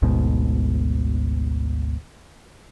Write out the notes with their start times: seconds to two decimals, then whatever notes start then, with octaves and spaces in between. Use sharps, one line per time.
0.02 G#1 D2 G#2 B2